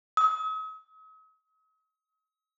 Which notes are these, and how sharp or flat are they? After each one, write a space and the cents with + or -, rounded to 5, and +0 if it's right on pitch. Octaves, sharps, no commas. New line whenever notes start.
D#6 +45